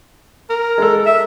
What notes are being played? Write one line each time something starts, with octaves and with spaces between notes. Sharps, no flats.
A#4
G#3 A4
E5